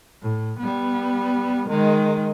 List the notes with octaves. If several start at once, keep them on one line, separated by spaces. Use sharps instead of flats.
A2
G3 B3
D#3 G#3